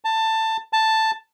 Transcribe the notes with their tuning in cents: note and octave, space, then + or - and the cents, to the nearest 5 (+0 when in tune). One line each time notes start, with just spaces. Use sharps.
A5 +15
A5 +5